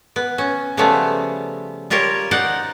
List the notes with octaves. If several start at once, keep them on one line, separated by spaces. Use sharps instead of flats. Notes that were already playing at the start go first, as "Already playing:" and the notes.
B3
C#4
C#3 F3 G3 A3 B3
G3 F4 G4 A#4 C#5
D#4 C5 D5 F#5